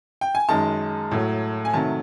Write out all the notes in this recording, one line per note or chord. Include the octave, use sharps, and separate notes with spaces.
G5
G#5
F#2 D#3 G#3 A5
A2 F#3 A3
G#5
C3 D#3 F#3 A3 A5